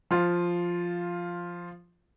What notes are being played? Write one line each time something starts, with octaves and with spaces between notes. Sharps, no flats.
F3 F4